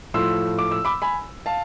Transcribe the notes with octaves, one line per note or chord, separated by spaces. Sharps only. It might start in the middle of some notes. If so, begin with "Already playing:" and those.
A2 F3 A3 C6 E6
D6
E6
B5 D6
G#5 B5
F5 A5